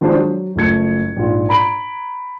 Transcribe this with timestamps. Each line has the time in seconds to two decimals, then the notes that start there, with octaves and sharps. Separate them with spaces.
0.01 D#3 F3 G#3 D4 F#4 C5
0.18 F#3
0.56 F#1 F3 A3 G#6 C#7
1.16 A#1 G#2 F4
1.49 A#5 B5 D7 F#7